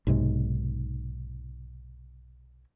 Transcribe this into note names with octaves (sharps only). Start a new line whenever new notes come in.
B1 G#2 C3 G#3